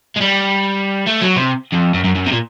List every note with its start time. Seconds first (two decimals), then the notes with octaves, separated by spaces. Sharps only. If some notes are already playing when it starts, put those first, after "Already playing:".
0.16 G#3
0.21 G3
1.07 A3
1.22 F#3
1.36 C3
1.72 F2
1.94 F#2
2.05 F#2
2.16 F#2
2.26 C3
2.33 A#2